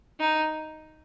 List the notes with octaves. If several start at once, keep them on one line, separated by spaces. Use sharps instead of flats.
D#4